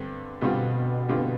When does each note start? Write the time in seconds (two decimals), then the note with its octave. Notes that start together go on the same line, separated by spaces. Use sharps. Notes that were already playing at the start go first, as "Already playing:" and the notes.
Already playing: G2 D3 G3 C4
0.41 G2 B2 D3 G3 C4 F4
1.09 G2 D3 G3 C4 F4